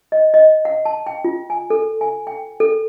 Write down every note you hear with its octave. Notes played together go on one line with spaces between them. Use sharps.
D#5
D#5
F#5
A5
G5
F4
G#5
A4
G#5
G5
A4